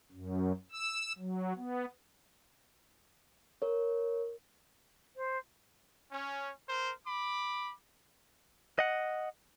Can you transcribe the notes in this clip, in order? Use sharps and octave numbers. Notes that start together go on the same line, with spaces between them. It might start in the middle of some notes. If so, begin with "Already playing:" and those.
F#2
E6
F#3
B3
A#4 C#5
C5
C#4
A#4 C5
B5 D6
D#5 F#5